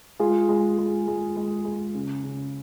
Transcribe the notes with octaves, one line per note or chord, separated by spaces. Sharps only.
G#3 F4 G#4
G#3
G#3
G#3
G#3
G#3
C#3
C#3